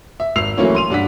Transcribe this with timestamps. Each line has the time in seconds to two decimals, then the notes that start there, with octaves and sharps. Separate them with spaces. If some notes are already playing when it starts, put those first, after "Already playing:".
0.20 E5
0.36 G#1 E6 C7 F7
0.57 E3 F#3 A3 A#3 C#4 E4
0.75 C6 D#7 F7
0.90 G2 D4 F#5 B6